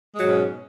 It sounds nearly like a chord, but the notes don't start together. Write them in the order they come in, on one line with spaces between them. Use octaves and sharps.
G#3 F#3 G#2 B2 C#4